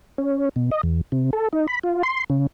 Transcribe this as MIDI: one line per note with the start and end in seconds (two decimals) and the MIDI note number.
0.18 0.49 61
0.56 0.70 47
0.71 0.81 75
0.83 1.01 40
1.12 1.30 48
1.33 1.48 69
1.53 1.67 63
1.68 1.79 83
1.83 2.03 65
2.03 2.24 84
2.30 2.47 49